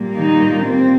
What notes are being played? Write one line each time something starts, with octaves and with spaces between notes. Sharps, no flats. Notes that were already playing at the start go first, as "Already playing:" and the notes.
Already playing: A#2 G3 A#3
D#3 D#4
C4